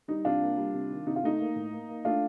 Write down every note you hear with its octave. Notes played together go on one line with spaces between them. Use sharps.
G3 D#4
C3 D4 F4
A#3
G3
C3
D#3
C3 D#4
F4
A3 D#4
A#3
A2
A#3
A#3
A3 D4 F4